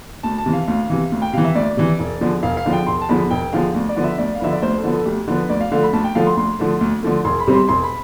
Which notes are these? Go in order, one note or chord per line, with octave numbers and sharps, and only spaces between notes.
D2 A5
A5
C3 E3
F5
D2 F5
C3 E3
D2
G5
C3 E3 F5
E5
D2 D5
C3 E3
E1
E2 D3 F3
E1 F5
F5
E2 D3 F3
G5
E1 C6
A5
E2 D3 F3 B5
E1 G5
E2 D3 F3 F5
D2
D5
D3 F3 B3
E5
D2 D5
F5
D3 F3 B3 E5
D5
D2 C5
A4
D3 F3 B3
A4
D2 G4
D3 F3 B3
B4
D2 D5
F5
D3 F3 A3 F5
B5
D2 A5
G5
D3 F3 A3 F5
C6
D2 C6
D3 F3 A3
D2
D3 F3 A3
E1 C6
B5
E2 C3 G3 C4
C6
E1 C6
B5